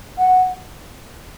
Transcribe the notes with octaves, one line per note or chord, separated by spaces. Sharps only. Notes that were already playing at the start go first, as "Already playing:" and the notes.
F#5